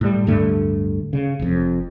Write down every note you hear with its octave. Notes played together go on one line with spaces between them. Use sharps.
A2 G3
D1 G2 D3 A3
C#3
F1 F2